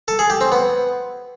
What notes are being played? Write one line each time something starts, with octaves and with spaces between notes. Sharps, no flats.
A4
G#4
G4
C4
B3